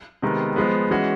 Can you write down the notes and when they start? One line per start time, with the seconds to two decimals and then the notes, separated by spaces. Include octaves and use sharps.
0.22 C3 D#3 G#3 B3
0.56 F3 G#3 B3
0.91 E3 G#3 C#4 F#4